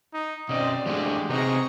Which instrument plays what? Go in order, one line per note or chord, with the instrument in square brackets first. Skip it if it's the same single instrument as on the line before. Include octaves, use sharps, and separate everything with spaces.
[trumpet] D#4
[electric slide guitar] B2 C#4 [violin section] C4 D5 [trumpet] D#5
[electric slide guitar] E3 A3 D4 [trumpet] G#3 [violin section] F#4 G4
[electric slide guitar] C3 B3 C4 [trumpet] D#4 [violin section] G#4 C#6 A#6